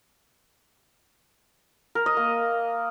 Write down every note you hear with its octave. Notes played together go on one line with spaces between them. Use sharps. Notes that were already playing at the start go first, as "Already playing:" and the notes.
A#4
D#5
A#3